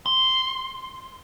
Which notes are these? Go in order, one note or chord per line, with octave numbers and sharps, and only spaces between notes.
C6